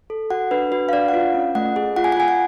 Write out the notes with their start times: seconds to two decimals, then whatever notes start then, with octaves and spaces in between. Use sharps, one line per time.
0.10 A4
0.30 F#4 F#5
0.51 D4 B4
0.72 F#4 B4
0.89 F5
0.93 D4 D5
1.08 F#5
1.14 F4 F5
1.35 C#4
1.55 A3 F#5
1.76 G#4
1.96 F4 F#5
2.04 G#5
2.12 F#5
2.17 F4 G#5
2.28 F#5